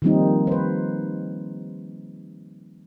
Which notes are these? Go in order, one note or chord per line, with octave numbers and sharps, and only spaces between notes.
D#3 F3 G3 A#3 C4 D#4
B4 C5